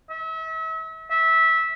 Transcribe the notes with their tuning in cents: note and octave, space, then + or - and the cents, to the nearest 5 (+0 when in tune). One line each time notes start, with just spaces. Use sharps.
E5 -35
E5 -20